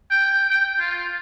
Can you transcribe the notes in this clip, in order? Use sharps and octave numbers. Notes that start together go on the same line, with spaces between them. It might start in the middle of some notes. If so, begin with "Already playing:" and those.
G5
G5
F4